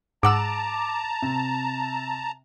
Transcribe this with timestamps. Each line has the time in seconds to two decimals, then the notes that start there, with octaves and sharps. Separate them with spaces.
0.23 G#2 F#5 A5 A#5 D6 E6
1.22 C3